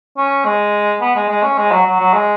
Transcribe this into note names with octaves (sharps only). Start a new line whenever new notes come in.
C#4
G#3
B3
G#3
G#3
C#4
G#3
F#3
F#3
F#3
G#3